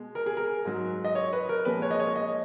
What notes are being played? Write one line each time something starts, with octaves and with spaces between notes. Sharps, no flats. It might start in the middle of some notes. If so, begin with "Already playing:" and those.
Already playing: B2 G#3
A#4
G#4
A#4
G#2 F#3
D#5
C#5
B4
A#4
A#2 F3 G#3 B4
C#5
D#5
C#5
D#5